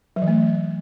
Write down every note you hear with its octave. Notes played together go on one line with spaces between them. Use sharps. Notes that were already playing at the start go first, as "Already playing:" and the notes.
F#3
E3
A3